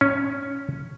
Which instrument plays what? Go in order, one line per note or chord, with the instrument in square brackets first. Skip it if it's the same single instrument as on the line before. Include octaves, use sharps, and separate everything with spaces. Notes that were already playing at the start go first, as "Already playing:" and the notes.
[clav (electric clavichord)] C#4